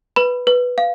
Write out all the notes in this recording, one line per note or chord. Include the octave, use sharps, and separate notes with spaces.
B4 B5
B4
F5